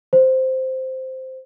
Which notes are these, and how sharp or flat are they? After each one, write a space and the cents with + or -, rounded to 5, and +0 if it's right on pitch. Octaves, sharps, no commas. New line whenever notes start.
C5 -5